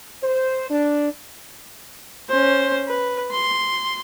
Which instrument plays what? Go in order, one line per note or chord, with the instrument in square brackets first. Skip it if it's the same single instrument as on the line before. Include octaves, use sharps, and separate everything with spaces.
[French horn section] C5
D4
[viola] C#4 C5
B4
C6